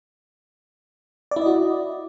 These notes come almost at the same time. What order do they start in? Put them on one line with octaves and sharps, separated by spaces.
D5 E4 D#5 F#4